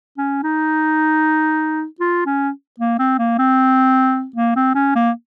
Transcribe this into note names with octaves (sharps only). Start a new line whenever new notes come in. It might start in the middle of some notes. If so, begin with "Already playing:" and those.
C#4
D#4
F4
C#4
A#3
C4
A#3
C4
A#3
C4
C#4
A#3